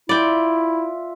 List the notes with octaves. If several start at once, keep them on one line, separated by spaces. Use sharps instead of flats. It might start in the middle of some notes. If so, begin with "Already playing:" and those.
E4 F4 D5 E5 G5